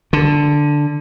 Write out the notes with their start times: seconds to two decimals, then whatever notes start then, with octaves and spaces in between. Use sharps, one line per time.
0.13 D3